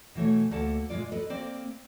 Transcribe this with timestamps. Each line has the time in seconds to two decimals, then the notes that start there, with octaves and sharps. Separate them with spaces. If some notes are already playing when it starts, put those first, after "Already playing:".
0.15 B2 E3 A3 C#5
0.51 D2 A#3 A4 D5 F#5 A5
0.90 A#2 G#3 F4 D5
1.12 A4 B4 D#5
1.30 A#3 C4 C5 D5